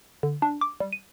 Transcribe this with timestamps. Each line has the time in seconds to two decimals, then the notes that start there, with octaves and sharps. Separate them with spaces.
0.23 D3
0.42 D4
0.61 D6
0.80 G3
0.93 D#7